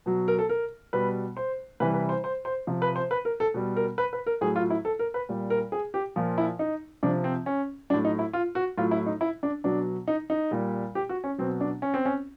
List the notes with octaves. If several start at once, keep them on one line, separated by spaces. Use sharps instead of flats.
B2 F#3
A#4
A4
A#4
B2 G3 B4
C5
C3 E3 G3 B4
B4
C5
C5
C5
C3 F3
B4
C5
B4
A#4
A4
B2 G3
A#4
B4
B4
A#4
A2 F#3 G#4
F4
E4
A4
A#4
B4
A#2 G3
A#4
G#4
G4
A#2 F3
E4
D#4
C3 F3 D4
C4
C#4
A2 F#3 D4
D#4
E4
F4
F#4
A2 F#3 F4
E4
D#4
E4
D4
B2 F#3 D4
D#4
D#4
A#2 G3
G4
F#4
C#4
B2 F#3 C4
D4
C#4
C4
C#4